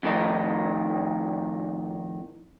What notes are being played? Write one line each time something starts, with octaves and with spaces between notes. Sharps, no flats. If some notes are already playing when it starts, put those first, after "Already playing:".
F2 A2 D#3 D#4